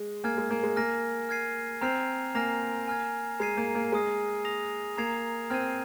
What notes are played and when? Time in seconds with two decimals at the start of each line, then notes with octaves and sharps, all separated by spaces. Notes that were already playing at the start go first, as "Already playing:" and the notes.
Already playing: G#3
0.24 A#3 G#5 F6 G#6
0.37 G#3
0.50 A#3
0.63 G#3
0.77 A#3 G#5 F6 A#6
1.29 F6 G#6 C7 D#7
1.81 C4 A#5 F6 C7 F7
2.35 A#3 G#5 F6 A#6 F7
2.88 G#5 F6 G#6
3.40 G#3 A#5 G#6 C7 D#7
3.57 A#3
3.75 A#3
3.92 G#3 G#5 D#6 C7
4.45 D#6 A#6 F7
4.97 A#3 A#5 G#6 C7 F7
5.50 C4 F6 G#6 D#7